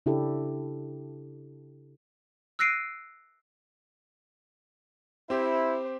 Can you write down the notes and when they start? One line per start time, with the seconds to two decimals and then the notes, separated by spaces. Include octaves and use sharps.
0.06 C#3 D4 E4 G4 A4
2.59 E6 F#6 A#6 C7 D7 D#7
5.30 C4 E4 G4 C5